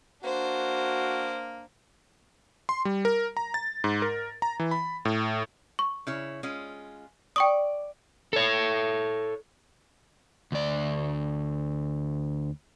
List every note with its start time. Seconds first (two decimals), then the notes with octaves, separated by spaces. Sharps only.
0.24 A#3 D4 F#4 C5
2.69 C6
2.85 G3
3.05 A#4
3.37 A#5
3.54 A6
3.84 G#2
4.02 A#4
4.42 A#5
4.60 E3
4.71 B5
5.05 A2
5.79 C#6
6.07 C#3 E4 C#5
6.43 G#3 C#4 F4
7.36 D5 G5 C#6 D#6
8.33 A4 C#5
10.52 D2 D5